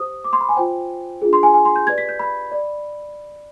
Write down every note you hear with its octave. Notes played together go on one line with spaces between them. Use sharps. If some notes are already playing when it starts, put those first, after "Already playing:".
Already playing: G4 C5 D#6
D6
C6
B5
G#5
F4 C5 G5
D4 F4 G#4
C6
G#5
G#5
C6
G6
G4 B4 D5 G#6
B6
G6
B5
D5